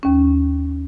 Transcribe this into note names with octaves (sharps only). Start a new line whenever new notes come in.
D#2 C#4